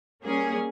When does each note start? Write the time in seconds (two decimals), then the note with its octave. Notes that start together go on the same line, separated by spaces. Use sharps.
0.23 G3 A#3 C#4 G#4